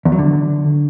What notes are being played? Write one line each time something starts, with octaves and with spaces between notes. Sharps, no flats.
E2
F#3
D3